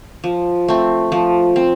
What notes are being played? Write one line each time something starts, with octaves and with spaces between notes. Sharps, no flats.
F3
A3 C4
F3
C4